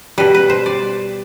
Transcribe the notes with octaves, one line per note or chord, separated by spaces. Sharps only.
B2 G3 B4
B4
C5
D5